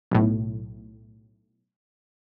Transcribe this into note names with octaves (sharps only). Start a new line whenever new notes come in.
B1 A2